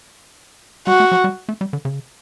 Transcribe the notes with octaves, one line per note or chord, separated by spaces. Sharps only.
G3 F#4
A3
F#3
G3
A3
G3
D3
C#3